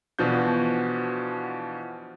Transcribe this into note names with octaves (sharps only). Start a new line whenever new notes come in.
B2 E3 F3 D4 F#4 G6